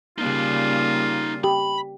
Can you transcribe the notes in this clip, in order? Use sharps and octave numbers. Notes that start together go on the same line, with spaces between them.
C#3 G3 A#3 D#4 F4 D5
G4 B5